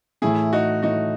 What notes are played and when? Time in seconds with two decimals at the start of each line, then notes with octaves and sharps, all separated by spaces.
0.22 A2 E3 A3 E4 G#4
0.53 D#4 F#4
0.83 A2 E3 A3 D#4 F#4